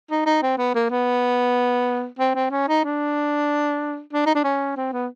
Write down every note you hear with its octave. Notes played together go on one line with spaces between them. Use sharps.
D#4
D#4
C4
B3
A#3
B3
C4
C4
C#4
D#4
D4
D4
D#4
D4
C#4
C4
B3